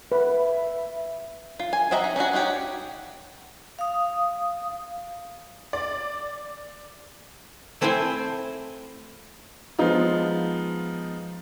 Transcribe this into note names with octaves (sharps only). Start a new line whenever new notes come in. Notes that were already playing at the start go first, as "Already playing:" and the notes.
B4 E5
F4
G#5
C4 F#4 D#5 E5 A#5
D#4
C#4 D4 E4 F#4
D4 D#4 F#4 G4 C#5
F5 D#6
D5
A3 C4 E4 C5 G5 G#5
F3 G#3 B3 D#4 F4